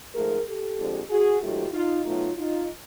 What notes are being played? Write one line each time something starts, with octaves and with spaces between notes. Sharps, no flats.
G#2 F3 A3 G#4 A#4
G4 A4
F2 D3 F3 G#3
F#4 G#4
G#2 D#3 F#3 A3 F4 G4
D#4 F4
B2 F#3 A3 D#4 F4
D#4 F4